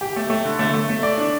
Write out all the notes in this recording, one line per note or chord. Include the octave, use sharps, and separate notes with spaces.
G4
A3
A3
D3
A3
A3
A3
D5
D4